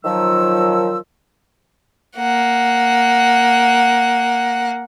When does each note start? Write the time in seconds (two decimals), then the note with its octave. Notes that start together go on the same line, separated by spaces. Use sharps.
0.05 D#3 F3 F#3 E6
2.17 A#3 F#5